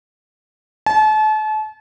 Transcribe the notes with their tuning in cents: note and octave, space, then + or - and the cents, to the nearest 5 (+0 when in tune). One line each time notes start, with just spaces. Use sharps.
A5 -35